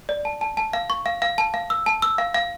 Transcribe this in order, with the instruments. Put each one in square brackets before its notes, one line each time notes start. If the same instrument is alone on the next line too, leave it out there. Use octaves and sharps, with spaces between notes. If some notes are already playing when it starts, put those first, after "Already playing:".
[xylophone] D5
A5
A5
A5
F5
C#6
F5
F5
A5
F5
E6
A5
E6
F5
F5